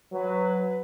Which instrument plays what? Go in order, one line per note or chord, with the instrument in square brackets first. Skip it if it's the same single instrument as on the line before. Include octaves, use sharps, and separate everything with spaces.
[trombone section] F#3 [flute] B4